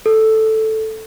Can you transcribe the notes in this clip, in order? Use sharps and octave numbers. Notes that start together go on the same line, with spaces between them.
A4